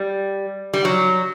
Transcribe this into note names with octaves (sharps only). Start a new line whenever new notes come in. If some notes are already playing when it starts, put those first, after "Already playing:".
Already playing: G3
G3
F#3